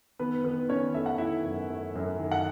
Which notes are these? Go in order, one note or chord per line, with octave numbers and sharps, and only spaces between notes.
D#3 B3 B4
D#3 B3 B4
D#3 C#4 C#5
A3 E5
F#5
D#3 E4 E5
F#2
A3
F#2
D#3
F#5